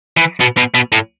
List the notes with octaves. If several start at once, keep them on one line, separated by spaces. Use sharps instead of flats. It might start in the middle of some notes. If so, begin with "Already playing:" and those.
E3
B2
B2
B2
A2